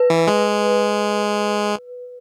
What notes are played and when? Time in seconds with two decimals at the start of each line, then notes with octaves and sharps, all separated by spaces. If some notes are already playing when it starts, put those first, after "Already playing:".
Already playing: B4
0.10 E3
0.27 G#3